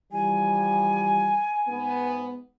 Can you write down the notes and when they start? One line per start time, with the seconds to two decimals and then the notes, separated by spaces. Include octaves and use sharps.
0.12 E3 F3 G3 G#5
1.67 G#2 B3